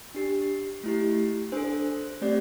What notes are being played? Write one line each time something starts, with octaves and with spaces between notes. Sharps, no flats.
D4 G4
A3 E4 G4
D4 A4 C5
A3 C4 G4 D5